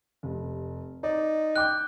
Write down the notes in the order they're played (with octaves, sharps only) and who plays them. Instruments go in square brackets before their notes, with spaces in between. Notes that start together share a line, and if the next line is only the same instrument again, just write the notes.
[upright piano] F1
[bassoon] D#4 [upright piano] D5
[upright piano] G5 D6 G6 [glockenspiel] F#6